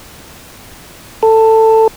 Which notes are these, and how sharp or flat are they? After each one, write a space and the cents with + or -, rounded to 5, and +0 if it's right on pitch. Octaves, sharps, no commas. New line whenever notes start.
A4 +15